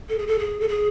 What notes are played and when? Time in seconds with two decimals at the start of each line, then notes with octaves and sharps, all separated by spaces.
0.09 A4
0.18 G#4
0.27 A4
0.39 G#4
0.60 A4
0.69 G#4